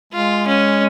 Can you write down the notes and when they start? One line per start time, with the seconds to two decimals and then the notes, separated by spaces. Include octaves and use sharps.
0.13 G#3 F4
0.47 C#4